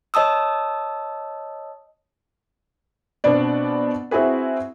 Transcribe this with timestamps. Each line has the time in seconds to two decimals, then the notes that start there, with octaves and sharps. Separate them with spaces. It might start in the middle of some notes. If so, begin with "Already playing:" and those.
0.14 C#5 D#5 A5 D#6 E6
3.24 B2 B3 C4 D4 D5
4.11 C4 E4 F#4 G#4 B4